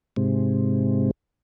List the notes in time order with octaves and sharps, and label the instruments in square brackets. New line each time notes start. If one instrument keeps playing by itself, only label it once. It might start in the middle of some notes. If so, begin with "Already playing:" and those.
[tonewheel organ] G#2 C3